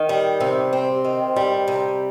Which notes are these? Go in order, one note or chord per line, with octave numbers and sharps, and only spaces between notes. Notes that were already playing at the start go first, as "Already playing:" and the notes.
Already playing: D#3
G3
C3
C4
D#3
G3
C3